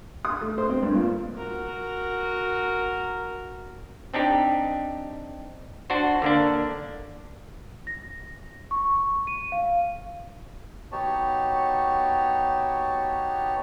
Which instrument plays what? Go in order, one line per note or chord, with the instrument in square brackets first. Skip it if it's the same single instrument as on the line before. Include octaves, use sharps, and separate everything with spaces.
[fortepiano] D#6
A3
C5
C4
G2
A#2
[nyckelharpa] F#4 A#4
[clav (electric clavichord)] C4 D4 D#4 G4
D4 F#4 C5
D3 A#3 D4
[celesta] A#6
C#6
D#7
F5
[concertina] B3 D#4 F#4 G4 C#5 A5